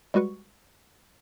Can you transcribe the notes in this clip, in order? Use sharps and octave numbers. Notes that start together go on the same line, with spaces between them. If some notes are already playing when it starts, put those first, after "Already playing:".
G3 G#3 F#4 B4 C#6